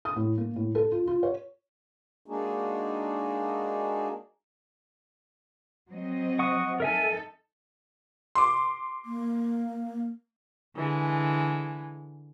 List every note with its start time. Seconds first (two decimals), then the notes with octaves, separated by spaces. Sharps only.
0.05 D#6
0.16 A2
0.38 A#3
0.56 A2
0.75 A4
0.92 F4
1.07 F4
1.23 C#5
2.26 G#3 A#3 D4 D#4 F#4 G#4
5.90 F#3 C4 D#5
6.39 F#5 C#6 D#6
6.80 D#4 A4 A#4 E5 G#5
8.35 C6 D6
9.05 A#3
10.75 D3 E3 G#3